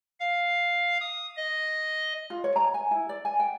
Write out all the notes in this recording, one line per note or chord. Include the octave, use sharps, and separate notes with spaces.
F5
D#6
D#5
F4
C#5
A#5
G#5
E4
D5
G#5
G5